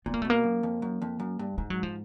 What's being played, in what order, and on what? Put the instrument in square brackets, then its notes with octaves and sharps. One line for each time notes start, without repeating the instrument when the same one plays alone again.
[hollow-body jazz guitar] A#2 [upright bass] B3
[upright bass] A#3
[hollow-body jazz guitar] B2 [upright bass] A3
[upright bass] A#3
[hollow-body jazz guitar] F#2
F2
F#2
F2
F#2
G2
[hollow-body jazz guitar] G#2 [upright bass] G#3
[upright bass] F#3
F3